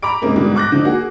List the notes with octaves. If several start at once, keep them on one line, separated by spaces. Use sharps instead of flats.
A#5 B5 D6 D7
G#2 C3 A#3 C#4 D#4
G#2 B2 D3 G3
C#6 D6 F#6 G6 A#6
D3 F3 D4 D#4
A#3 F#4 G#4